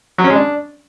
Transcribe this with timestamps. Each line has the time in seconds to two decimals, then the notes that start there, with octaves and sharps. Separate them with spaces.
0.18 F#3
0.24 C#4
0.30 G#3
0.36 D4